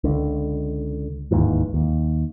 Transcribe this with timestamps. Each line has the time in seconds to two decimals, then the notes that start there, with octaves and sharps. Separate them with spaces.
0.04 C#2 D3
1.31 D1 D#2 G#2 E3
1.74 D#2